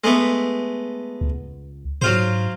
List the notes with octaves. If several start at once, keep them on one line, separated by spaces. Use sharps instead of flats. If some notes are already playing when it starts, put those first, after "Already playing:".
G#3 A3 B3
C#2
G#2 F#3 F4 C5